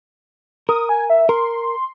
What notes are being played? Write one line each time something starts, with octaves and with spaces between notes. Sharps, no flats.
A#4 D#6
G#5
E5
A#4 C6